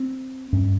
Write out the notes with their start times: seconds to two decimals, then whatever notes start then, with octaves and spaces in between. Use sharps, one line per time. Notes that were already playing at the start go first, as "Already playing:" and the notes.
Already playing: C4
0.53 G2 C#4